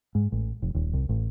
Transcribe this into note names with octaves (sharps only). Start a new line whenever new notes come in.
G#2
A1
F1
D#1
C2
A1